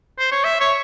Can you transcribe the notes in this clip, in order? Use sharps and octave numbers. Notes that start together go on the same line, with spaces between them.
C5
C#5
E5
C#5